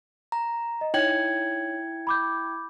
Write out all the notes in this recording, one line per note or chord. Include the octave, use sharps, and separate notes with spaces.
A#5
D#5
D#4 E4 C#5 G5 G#6 F#7
B5 D6 G6